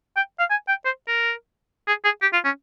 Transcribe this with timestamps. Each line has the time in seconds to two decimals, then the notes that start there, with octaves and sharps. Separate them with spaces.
0.16 G5
0.39 F5
0.51 G#5
0.68 G5
0.85 C5
1.08 A#4
1.88 G#4
2.04 G#4
2.22 G4
2.33 F4
2.45 C#4